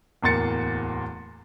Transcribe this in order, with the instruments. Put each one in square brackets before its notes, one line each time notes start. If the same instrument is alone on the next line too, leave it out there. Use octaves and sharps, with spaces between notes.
[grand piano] D1 E2 A#3 C6 A6 C#7